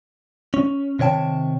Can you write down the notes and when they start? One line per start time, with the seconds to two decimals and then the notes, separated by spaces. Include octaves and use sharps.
0.54 C#4
0.99 C3 D#3 C#5 G5 A5